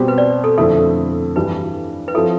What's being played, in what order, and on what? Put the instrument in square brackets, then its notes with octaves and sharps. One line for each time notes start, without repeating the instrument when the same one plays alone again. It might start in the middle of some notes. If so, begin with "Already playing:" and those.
Already playing: [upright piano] B2 G3 C4 G4
[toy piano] B4
D5
A4
[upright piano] F2 D3 A3 E4 [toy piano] A4
[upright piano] G2 E3 G3 D4 [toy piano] B4
[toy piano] B4
[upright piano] F3 C4 E4 [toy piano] A4